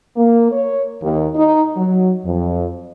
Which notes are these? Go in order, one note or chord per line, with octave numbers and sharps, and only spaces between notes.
A#3
C#5
D#2
D#4
F#3
F2